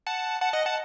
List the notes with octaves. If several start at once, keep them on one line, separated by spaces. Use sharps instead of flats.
F#5 A5
F#5 A5
D#5 F#5
F#5 A5